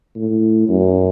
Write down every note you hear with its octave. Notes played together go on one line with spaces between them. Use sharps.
A2
F#2